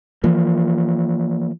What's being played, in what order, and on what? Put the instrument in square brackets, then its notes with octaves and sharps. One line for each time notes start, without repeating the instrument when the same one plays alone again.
[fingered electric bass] E3 F3 A#3